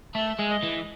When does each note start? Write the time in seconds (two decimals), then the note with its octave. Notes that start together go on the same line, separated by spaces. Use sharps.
0.15 A3 E5
0.39 G#3
0.50 D#5
0.63 E3